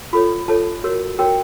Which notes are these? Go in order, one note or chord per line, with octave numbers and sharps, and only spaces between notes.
F4 A4 C#5 B5
F4 A4 C#5 A5
F#4 A#4 C#5
F#4 A#4 C#5 G5